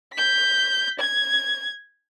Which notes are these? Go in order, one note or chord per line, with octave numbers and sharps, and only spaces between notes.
G6 B6
G#6